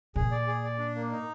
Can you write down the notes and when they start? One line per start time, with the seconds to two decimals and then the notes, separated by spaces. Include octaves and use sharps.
0.16 A#2 G#4
0.31 D5
0.47 G#4
0.64 D5
0.79 D4
0.95 A#3
1.12 D#4